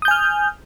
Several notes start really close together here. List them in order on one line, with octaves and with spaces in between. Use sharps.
D#6 G6 G#5 F6